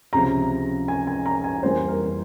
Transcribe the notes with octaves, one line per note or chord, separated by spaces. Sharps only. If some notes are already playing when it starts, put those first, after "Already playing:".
C#2 C3 F3 A#5
G#5
G#5
A#5
G#5
F2 E3 G3 A#3 C5
A#4